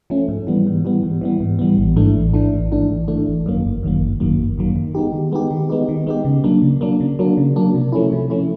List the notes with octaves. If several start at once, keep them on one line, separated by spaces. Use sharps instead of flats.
F3 A3 C#4
G#2
E3 G3 B3
G#2
E3 G3 B3
G#2
E3 G3 B3
G#2
E3 G3 B3
A1
G#2 E3 A3 D4
A1
G#2 E3 A3 D4
A1
G#2 E3 A3 D4
A1
G#2 E3 A3 D4
G1
F#2 D#3 F#3 A#3
G1
F#2 D#3 F#3 A#3
G1
F#2 D#3 F#3 A#3
G1
F#2 D#3 F#3 A#3
D#3
G#3 B3 D#4 G4
D#3
G#3 B3 D#4 G4
D#3
G#3 B3 D#4 G4
D#3
G#3 B3 D#4 G4
C#3
F#3 A#3 D4
C#3
F#3 A#3 D4
C#3
F#3 A#3 D4
C#3
F#3 A#3 D4
C3
F3 A3 C#4 E4
C3
F3 A3 C#4 E4